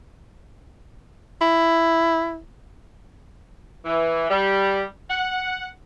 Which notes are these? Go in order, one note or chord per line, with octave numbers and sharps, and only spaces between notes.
E4
E3
G3
F#5